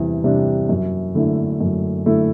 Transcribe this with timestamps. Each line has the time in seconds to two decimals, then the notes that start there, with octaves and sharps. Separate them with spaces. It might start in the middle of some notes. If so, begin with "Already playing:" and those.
Already playing: E2 C3 G3
0.24 C3 G3 D4
0.69 F#2
1.15 D3 A3 E4
1.60 F#2
2.06 D3 A3 E4